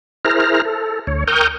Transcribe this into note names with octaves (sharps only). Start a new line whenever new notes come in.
E4 G#4 A#4 C5 A#5 F6
A4
D2 C#5
A#4 G5 C#6 D#6 F6 G6